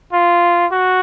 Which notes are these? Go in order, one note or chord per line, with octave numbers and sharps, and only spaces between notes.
F4
F#4